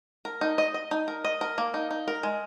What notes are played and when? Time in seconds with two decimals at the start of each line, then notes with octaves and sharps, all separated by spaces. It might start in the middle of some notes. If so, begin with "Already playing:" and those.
0.25 A#4
0.41 D#4
0.58 D#5
0.74 D#5
0.91 D#4
1.08 A#4
1.25 D#5
1.41 A#4
1.58 A#3
1.74 D#4
1.91 D#4
2.08 A#4
2.23 G#3